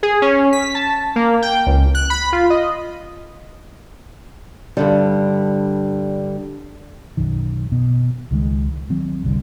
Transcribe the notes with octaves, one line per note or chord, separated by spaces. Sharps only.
G#4
C#4
B6
A5
A#3
G5
C#2
F#6
B5
F4
D#5
G2 D3 G3
B1 F#2 D#3
B2
C#2 D#3 G#3
D#3 F#3 C4
F#1 C2 A#2 D3